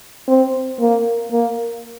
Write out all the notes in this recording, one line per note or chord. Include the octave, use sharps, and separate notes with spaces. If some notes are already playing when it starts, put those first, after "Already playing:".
C4
A#3
A#3